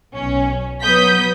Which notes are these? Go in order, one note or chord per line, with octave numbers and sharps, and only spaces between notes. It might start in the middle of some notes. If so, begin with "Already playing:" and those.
B1 C#4
F#3 B3 D#6 G6 B6